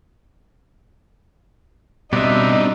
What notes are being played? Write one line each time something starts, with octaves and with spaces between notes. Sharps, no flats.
B2 G3 C4 D4 D#4 D#5 E5